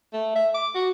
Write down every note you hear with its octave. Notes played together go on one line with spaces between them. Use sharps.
A3
E5
D6
F#4